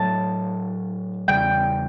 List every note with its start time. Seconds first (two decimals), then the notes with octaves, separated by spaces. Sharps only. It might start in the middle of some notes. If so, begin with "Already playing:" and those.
Already playing: A2 F#3 A3 A5
1.28 E2 C#3 G3 G5